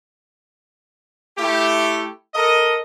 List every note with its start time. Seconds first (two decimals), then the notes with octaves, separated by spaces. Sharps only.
1.38 A3 E4 G4
2.34 A4 A#4 D#5